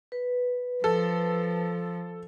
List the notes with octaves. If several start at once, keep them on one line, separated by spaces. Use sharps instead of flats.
B4
F3 A4